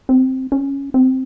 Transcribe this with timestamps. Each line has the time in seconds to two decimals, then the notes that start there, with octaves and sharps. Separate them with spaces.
0.09 C4
0.52 C#4
0.94 C4